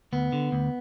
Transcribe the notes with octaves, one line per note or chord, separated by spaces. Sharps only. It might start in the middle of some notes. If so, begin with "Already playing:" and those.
D2 B3
D3
D2